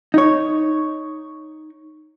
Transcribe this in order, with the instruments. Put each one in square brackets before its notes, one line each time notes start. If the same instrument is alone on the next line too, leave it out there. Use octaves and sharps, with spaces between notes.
[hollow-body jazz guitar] D#4 C#5